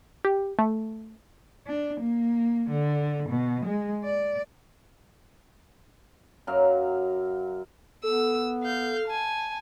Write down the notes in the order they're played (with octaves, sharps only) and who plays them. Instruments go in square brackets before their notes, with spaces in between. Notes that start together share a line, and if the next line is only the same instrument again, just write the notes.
[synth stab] G4
A3
[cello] D4
A#3
D3
B2
G#3
D5
[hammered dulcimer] F#2 F#3 F5
[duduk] B3 [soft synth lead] A4 [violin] E6
[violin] F5 G6
G#5 A5